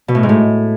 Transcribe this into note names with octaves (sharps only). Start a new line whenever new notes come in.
B2
A2
G#2
A2